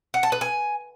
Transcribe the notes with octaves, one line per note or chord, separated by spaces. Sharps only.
F#5
A5
B4
G#5